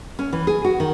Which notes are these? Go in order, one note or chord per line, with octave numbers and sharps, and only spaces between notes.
C#4
E3
G#4
F#4
D#3